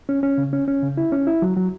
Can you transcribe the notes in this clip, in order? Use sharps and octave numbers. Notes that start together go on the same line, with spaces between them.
C#4
C#4
C#3
C#4
C#4
C#3
E4
C#4
E4
F#3
F#3